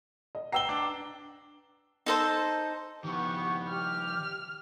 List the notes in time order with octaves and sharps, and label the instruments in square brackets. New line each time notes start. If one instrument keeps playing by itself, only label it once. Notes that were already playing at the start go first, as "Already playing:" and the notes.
[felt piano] D#5
[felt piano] B4 G5 C7 [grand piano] A#5 E6 G7
[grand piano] D4
[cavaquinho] D#4 A4 C5
[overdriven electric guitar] D#3 F3 [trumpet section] B3 C#6 [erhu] G4
[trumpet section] G4 [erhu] F6